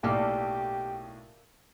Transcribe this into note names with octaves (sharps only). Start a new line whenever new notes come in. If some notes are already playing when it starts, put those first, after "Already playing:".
B1 A2 A#3 G4 A4 D5